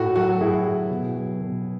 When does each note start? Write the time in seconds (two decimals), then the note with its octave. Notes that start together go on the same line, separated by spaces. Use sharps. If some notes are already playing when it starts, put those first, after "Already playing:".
Already playing: A2 F#4 A4
0.16 F#3 F#4 A4
0.41 A2 E4 G#4
0.66 F#3
0.91 B2
1.16 F#3
1.40 B2